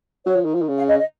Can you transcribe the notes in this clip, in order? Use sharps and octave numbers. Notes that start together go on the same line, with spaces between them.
F#3 C#5
F3
D#3
F3
D#3
C#3
F5
D#5
D#5